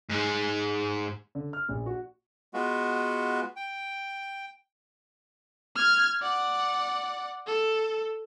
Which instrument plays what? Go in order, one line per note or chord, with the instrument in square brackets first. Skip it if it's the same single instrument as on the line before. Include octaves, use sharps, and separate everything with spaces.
[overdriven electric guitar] G#2 G#3
[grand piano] D3
F6
A#1
F#4
[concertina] G#3 B3 F4 F#4
G5
[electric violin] F6 G#6
D5 F#5
A4